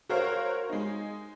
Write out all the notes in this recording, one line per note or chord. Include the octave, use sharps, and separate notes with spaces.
F#4 A#4 C5 C#5 F5
G#3 D#4